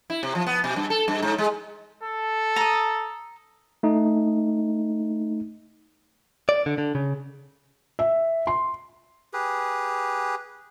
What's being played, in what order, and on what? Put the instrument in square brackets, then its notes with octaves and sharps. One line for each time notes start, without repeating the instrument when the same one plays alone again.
[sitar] E4
C3
F3
B3
B2
G2
A4
G2
G#2
G#3
[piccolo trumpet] A4
[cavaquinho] A#5 D#6
[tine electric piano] A3 D#4
[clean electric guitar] D5
D3
D3
C#3
[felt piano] E5
C6
[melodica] G4 G#4 B4